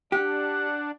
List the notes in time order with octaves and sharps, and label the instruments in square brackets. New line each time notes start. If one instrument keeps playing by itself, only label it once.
[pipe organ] D4 [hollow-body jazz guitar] G4 [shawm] F#5